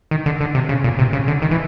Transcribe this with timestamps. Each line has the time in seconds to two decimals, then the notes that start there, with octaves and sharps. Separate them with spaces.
0.11 D#3
0.26 D3
0.41 D3
0.55 C3
0.69 C#3
0.84 A#2
0.99 C3
1.13 C#3
1.28 D3
1.42 D#3
1.51 E3